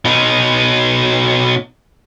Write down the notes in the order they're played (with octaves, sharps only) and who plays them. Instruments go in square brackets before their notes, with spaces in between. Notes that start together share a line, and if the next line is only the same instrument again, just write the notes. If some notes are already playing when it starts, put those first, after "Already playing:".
[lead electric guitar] B2 D#4